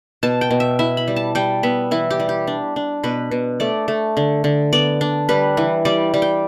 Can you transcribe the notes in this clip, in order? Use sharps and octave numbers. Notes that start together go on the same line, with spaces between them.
B2 A5
G5
B2
E5
E4 E5
B5
G3
A5
G3 G5
B3 E5
E3 E4
G4
G3
G4
D4
D4
B2 B4
B2
A3 D5
A3
D3
D3
B3 D5
D4
G3 B4
E3
G3 D5
G3
G5